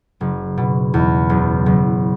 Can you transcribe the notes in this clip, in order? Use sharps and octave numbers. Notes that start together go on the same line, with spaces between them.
F#1
B2
E2
F#1
F#1